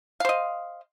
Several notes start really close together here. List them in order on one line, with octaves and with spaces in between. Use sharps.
F5 C5 D#5